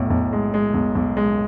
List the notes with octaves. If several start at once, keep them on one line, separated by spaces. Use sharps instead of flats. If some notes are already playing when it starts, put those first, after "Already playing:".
Already playing: B1 A2
B1
G#3
G#3
B1
B1
G#3